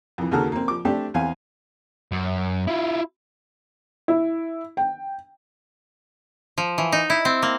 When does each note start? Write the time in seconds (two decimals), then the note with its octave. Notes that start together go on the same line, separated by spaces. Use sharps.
0.18 F2 E3
0.31 D#2 C#3 A#3 F#4 A4 F6
0.52 A#3 C4
0.68 F3 D6
0.85 A3 C4 D4 G4
1.14 E2 C4 F5 G#5
2.12 F#2
2.67 E4 F4
4.08 E4
4.77 G5
6.58 F3
6.78 E3
6.92 D#4
7.10 E4
7.25 C4
7.42 A#3